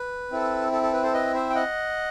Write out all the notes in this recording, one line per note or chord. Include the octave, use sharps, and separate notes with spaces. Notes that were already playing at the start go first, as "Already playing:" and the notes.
Already playing: B4
C4 E4 A4
A4
A4
B4
A4 C5
B4 D#5
C5 E5
G5
D#5 F#5